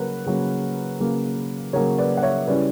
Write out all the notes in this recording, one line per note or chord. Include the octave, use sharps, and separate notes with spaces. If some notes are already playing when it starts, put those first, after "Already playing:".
Already playing: C#3 F#3 A#3 A#4 B4
C#3 F#3 A#3
C#3 F#3 A#3
C#3 F#3 A#3 A#4 C#5
B4 D5
F#5
C#5 E5
C#3 G3 C#4 E4 B4 D5